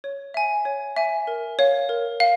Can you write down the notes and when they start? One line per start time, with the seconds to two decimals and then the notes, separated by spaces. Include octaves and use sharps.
0.04 C#5
0.34 E5 G#5
0.65 C#5
0.96 E5 G#5
1.27 A#4
1.59 C#5 F5
1.89 A#4
2.20 F5